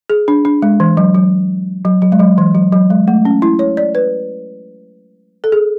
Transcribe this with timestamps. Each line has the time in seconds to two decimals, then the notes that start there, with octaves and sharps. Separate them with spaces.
0.10 G#4
0.28 D4
0.45 D4
0.62 G#3
0.80 E3
0.97 F#3
1.14 F#3
1.85 F#3
2.02 F#3
2.12 G#3
2.19 F#3
2.38 E3
2.55 F#3
2.72 F#3
2.90 G#3
3.08 A3
3.25 C#4
3.42 E4
3.59 C#5
3.77 D5
3.95 B4
5.44 A4
5.52 G#4